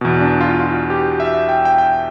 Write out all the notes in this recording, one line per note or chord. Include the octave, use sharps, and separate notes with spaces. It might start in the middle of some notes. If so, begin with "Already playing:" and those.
E2 B2
D4
F4
F4
G4
E5
G5
G5
G5